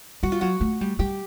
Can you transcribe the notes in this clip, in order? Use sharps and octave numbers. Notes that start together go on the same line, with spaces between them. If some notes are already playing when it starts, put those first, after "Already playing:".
G3 F#4
F4
F#3 F#4
A3
G3
G3 G4